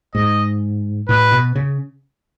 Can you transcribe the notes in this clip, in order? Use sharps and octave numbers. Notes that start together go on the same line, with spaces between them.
G#2 D#5
A2 B4
B2
C#3